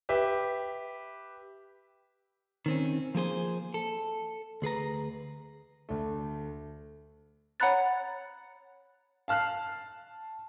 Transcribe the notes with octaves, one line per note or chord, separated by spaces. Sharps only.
G4 B4 E5
D#3 C4 C#4
F3 A#3 G#4 C5
A4
D2 G#4 B4 A#5
D2 A3
C#5 F#5 A#5 B5 F#6 A6
F5 A5 F6 F#6 C7